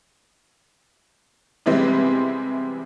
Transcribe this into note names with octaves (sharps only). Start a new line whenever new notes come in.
C3 E3 G3 G#3 B3 C4